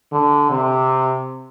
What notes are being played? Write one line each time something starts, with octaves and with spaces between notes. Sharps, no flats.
D3
C3